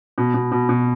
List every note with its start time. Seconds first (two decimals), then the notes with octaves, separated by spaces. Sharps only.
0.18 B2
0.34 B2
0.52 B2
0.69 B2